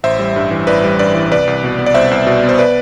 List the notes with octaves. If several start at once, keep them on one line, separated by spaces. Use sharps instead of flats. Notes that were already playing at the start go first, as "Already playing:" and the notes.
A1 C5 E5
G3
G2
E3
A1 B4 D5
G3
G2 B4 D5
E3
C2 B4 D5
C2
B2
B3
D5
C2 C5 E5
C2
B2
B3
C5
B4 D5